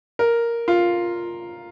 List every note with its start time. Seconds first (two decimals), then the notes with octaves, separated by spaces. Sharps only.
0.19 A#4
0.68 F4